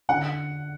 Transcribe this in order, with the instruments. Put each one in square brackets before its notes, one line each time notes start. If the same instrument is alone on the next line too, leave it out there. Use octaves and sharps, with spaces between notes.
[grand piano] D3 [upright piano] F#5